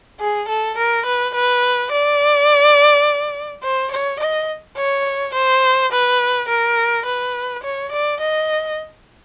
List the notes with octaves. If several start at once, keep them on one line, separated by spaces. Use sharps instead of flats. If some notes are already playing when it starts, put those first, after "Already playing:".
G#4
A4
A#4
B4
B4
D5
C5
C#5
D#5
C#5
C5
B4
A#4
B4
C#5
D5
D#5